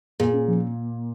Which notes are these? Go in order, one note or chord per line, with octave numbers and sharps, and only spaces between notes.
A#2 G#4
C#4
F3